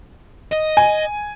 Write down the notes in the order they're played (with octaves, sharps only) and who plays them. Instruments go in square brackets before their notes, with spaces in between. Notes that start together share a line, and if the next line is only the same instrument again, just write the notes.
[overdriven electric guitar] D#5
[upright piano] G#5